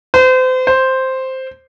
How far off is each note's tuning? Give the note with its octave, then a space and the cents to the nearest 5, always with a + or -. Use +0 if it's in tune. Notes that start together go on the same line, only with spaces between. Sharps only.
C5 -35
C5 +0